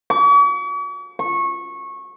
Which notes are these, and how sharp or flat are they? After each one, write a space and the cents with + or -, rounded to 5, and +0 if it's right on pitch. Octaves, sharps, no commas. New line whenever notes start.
C#6 +45
C#6 -20